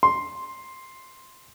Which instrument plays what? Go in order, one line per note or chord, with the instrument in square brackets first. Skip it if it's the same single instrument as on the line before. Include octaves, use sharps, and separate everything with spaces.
[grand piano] C6